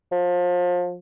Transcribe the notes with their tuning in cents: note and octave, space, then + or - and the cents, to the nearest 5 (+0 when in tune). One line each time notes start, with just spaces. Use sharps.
F3 +30